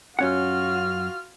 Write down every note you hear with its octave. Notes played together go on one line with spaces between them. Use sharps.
F#2 C#4 F4 F#4 F#5 F6